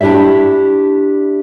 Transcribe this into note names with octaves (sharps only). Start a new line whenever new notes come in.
D4 E4 G4 D5 E5